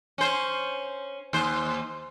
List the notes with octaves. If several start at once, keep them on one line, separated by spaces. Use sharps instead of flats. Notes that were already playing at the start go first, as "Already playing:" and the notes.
C#4 C5
D#2 C5